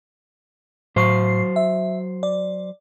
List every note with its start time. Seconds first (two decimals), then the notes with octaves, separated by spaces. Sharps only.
0.96 A2 F#3 C5 C#6 C7
1.56 E5
2.23 D5